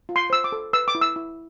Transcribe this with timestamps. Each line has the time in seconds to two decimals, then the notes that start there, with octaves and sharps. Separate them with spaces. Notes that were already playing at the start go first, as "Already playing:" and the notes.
0.09 F4
0.16 C6
0.30 C5 E6
0.44 D6
0.52 A4
0.73 B4 E6
0.88 D6
0.95 E4
1.01 E6
1.16 E4